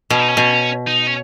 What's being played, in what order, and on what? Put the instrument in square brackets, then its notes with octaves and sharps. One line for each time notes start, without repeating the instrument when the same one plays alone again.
[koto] B2 [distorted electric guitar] C#4
[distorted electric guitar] D#4
C#4
[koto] B2
[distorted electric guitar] D#4
C#4